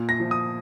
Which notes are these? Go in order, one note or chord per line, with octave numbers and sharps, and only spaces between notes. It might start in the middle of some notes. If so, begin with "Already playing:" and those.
Already playing: A#2
A#6
F3
D#6